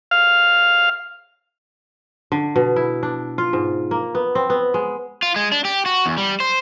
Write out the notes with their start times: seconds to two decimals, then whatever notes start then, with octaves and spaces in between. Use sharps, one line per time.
0.11 F5
2.32 D3
2.56 B2
2.76 E4
3.03 D4
3.38 F4
3.53 G#2
3.91 A#3
4.15 B3
4.35 C4
4.50 B3
4.74 G#3
5.23 F4
5.36 G#3
5.52 D4
5.65 G4
5.86 F#4
6.06 E2
6.18 G3
6.40 C5